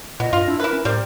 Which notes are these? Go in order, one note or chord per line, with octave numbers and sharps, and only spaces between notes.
A#2 B3 D#5
G2 F4
D4 E4
E4 A#4 B4
C#4
A2 G3 C4 A#4